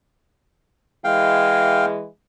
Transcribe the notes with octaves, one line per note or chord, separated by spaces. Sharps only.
E3 G#3 F5 G5